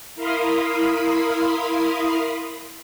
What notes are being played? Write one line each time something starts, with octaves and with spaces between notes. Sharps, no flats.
E4 A#4 F5 B5 C6 D#6